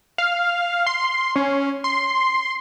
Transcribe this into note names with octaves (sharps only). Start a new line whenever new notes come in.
F5
C6
C#4
C6